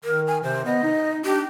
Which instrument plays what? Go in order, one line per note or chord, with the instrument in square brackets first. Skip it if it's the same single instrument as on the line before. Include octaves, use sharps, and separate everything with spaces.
[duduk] D#3 [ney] A#4
[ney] G#5
[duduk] C3 [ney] C5
[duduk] B3 [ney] D#5
[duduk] D#4
[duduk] D4 [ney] G4